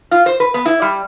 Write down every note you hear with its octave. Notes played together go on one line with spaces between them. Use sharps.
F4
C5
B4
B3
E4
G3